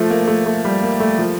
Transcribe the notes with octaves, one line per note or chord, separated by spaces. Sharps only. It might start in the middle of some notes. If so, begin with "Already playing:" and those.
Already playing: F3 A3
A#3
A3
A3
G3
A#3
A3
F3